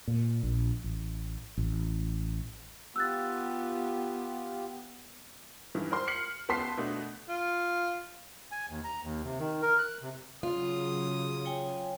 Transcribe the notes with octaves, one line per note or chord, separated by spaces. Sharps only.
A#2
A#1
A1
A1
B3 F4 G4 E6 F#6 A6
G2 D#3 E3
A#4 C5 C6
F6 C7 C#7 F#7
C#2 B3 A5 C6 B6 C7
B2 A3 B3 D4
F4
G#5
D#2
A#5
D#2
C3
D#3
A#4
F#6
C3
C#3 F#3 F4 D#6
C#5 G5 G#5